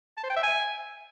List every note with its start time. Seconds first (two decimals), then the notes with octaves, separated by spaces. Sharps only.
0.17 A5
0.24 C5
0.30 G5
0.36 E5
0.43 G#5